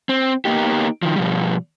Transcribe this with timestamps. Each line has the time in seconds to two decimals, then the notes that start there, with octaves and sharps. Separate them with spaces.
0.09 C4
0.45 A#3 B3 D#4 G4
1.03 D#3 F3
1.16 B2 F3 G3